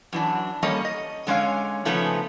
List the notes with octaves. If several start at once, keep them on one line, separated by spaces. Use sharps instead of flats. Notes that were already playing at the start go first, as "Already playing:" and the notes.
F#2 E3 D4
G3 A#3 C#4 A4 C#5 D#5
D#5
D3 G#3 C#4 C#5 F5
C#3 F3 A3 B3 C#4 D#4